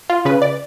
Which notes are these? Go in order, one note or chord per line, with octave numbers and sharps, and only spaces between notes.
F4
C#3 B4
D5